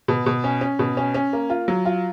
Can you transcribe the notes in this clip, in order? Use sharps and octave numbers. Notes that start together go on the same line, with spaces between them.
B2
B2
C#4
C#4
B2
C#4
C#4
A#3
F4
F#3
F4